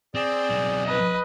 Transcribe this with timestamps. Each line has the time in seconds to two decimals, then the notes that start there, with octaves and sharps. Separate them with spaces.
0.15 C4 G#4 D5
0.50 B1 C4
0.85 B4 D#5